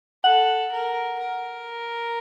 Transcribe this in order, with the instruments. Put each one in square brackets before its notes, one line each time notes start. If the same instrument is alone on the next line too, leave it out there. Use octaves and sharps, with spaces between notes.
[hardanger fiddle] A4 [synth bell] F#5
[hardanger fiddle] A#4
A#4